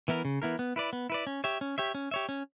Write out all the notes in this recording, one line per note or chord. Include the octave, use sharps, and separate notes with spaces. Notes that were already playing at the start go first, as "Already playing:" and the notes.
E3 B3 E4 A#4
C#3
E3 B3 E4 A#4
B3
E4 B4 D5
B3
E4 B4 D5
C#4
G4 C#5 E5
C#4
G4 C#5 E5
C#4
G4 C#5 E5
C#4